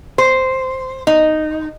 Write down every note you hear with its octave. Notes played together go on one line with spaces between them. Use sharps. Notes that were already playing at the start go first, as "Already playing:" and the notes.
C5
D#4